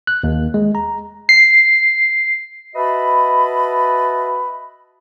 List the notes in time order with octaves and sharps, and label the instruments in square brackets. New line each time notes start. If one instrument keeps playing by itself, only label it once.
[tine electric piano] F#6
D#2
G#3
A#5
[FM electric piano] C7
[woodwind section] F#4 B4 D#5 E5 A5 B5